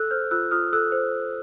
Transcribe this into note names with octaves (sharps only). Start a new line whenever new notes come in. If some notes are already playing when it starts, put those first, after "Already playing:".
Already playing: A4 E6 F#6
C5 F6 G6
F4 E6 F#6
F4 D#6 F6
A4 E6 F#6
C5